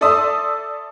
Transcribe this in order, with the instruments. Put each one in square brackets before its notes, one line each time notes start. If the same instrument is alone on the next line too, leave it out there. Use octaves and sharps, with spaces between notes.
[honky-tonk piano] A4 D5 E5 C6 D#6 E6